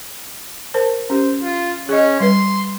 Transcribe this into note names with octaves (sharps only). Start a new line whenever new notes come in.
A#4 C5 A5
C#4 G4 C5
F4
C#4 G#4 D#5
G3 B4 C6